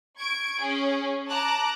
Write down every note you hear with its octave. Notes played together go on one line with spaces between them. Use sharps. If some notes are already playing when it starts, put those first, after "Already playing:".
C#6 G#6 D7
C#4 G#4
A5 A#5 D6 F#6